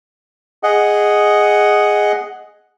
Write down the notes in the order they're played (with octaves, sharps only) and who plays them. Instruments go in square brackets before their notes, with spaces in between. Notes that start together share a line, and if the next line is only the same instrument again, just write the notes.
[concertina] G#4 D#5 F#5